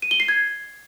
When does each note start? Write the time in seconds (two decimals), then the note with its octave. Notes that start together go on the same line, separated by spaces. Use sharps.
0.02 D#7
0.11 G7
0.20 C7
0.28 G#6